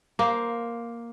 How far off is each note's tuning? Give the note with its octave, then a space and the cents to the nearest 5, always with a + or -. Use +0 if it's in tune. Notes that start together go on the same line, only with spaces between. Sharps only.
A#3 +5 C5 +0